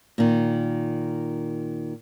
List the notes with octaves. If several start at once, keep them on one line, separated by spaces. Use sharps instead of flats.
A#2 D#3